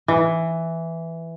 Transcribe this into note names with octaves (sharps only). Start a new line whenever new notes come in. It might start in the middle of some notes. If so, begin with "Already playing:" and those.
E3